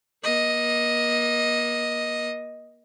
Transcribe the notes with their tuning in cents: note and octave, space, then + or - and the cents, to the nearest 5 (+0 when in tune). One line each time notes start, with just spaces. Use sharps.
A#3 +40 D#5 +5